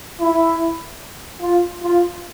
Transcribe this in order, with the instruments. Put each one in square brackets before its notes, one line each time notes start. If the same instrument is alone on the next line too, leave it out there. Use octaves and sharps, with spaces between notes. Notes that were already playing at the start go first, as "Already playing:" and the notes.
[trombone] E4
F4
F4